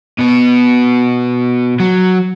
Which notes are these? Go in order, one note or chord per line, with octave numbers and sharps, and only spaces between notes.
B2 B3
F#3